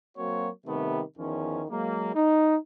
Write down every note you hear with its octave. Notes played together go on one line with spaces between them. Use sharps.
F#3 A#3 C4 F#4 C#5
C3 D#3 G3 A3 B3
E2 D#3 F3 C#4
F#3 G#3 A#3
D#4